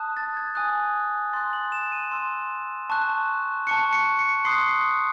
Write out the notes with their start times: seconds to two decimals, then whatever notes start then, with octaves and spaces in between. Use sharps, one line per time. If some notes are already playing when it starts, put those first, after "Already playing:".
Already playing: A5 D#6 F#6
0.17 A6
0.37 G#6
0.55 G#5 D#6 F#6
1.33 C6 F#6 A6
1.53 F#7
1.72 E7
1.92 D#7
2.11 C6 E6
2.90 A5 C#6 F#6
3.67 A5 C#6 F#6 C#7
3.93 C#7
4.19 C#7
4.45 C6 D#6 F#6 C7